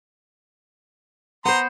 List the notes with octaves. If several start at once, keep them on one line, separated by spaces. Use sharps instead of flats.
B3 C5 A#5 C6